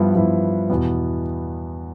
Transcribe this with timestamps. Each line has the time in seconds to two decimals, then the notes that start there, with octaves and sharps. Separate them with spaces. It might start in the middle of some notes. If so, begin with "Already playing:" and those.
Already playing: G2 F3 B3 E4
0.15 G2 F3 B3 E4
0.70 E2 B2 B3